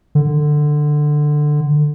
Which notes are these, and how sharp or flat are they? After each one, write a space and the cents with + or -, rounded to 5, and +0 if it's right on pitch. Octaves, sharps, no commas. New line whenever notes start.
D3 +15